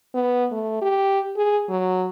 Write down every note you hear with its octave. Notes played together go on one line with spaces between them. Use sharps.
B3
A3
G4
G#4
F#3